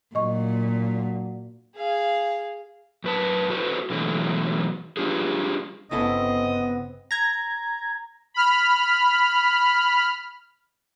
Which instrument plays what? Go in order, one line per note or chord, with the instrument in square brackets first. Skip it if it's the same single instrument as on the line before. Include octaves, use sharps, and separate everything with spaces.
[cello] A#2 [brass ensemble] F#3 D4 F#4 [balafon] D#5 C#6
[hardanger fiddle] G#4 F5
[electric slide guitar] F#2 B4 A5
F#4 A4 B4 C5
B2 D3 E3 F#3 A3
G3 D4 F4 G4 G#4
[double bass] G1 C4 [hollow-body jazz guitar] C#3 E4 A4 [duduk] B3 [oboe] D#5
[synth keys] A#5 G#6
[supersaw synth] B5 F6